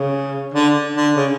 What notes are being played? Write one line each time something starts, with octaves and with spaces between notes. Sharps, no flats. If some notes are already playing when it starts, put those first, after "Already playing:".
Already playing: C#3
D3
D3
C#3